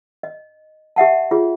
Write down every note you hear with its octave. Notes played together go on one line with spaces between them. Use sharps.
D#5
G4 E5 F#5 A5
F4 G#4 C#5